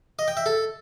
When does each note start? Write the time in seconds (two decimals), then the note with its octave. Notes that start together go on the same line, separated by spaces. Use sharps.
0.19 D#5
0.28 G5
0.37 E5
0.46 A4